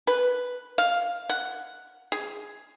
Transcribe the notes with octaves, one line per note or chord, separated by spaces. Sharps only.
B4
F5
F#5
G#4